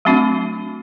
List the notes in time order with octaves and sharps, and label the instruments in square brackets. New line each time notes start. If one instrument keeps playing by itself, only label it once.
[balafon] F#3 A3 C4 D4 F#4